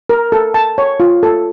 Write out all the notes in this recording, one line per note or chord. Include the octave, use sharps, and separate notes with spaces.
A#4
A4
A5
C#5
F4
A4